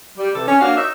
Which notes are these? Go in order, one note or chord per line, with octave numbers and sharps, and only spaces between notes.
G3
C3 E3 A4
C#4
A#3 C#4 D4 F#4 F5
D#4 C#5 E5